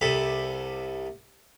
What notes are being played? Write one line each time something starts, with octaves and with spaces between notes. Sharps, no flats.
C2 C3 A4 B5